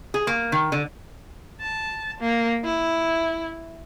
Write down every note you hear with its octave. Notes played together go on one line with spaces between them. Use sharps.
G#4
A#3
D#3
D3
A5
A#3
E4